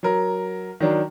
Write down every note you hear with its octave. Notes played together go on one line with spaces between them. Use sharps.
F#3 A#4
D#3 F#3 D4